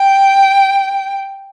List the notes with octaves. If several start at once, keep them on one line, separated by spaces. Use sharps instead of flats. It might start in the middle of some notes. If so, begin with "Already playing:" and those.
Already playing: G5